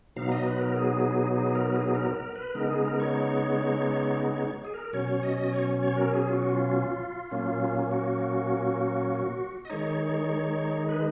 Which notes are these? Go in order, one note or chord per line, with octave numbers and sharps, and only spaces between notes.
B2 F#3 B3 D#4 F5
D#5
B4
A#4
G#4
G#4
A#4
A#4
G#4
A#4
A#4
B4
C#3 G#3 B3 D#4 A#4
G#4
A#4
C#5
C#5
G#4
A#4
B2 F#3 C#4 C#5
C#5
D#5
D#5
C#5
C#5
A#4
G#4
F4
F#4
F4
A#2 F#3 A#3 C#4
F#4
D#5
D#3 G#3 D#4 C#5
B4